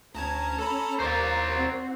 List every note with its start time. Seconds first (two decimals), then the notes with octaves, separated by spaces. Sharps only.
0.15 D2 C#4 A5 A#5 G#6
0.58 A4 A5 B5
1.00 D#2 A#3 C5 D5
1.51 C4 F#4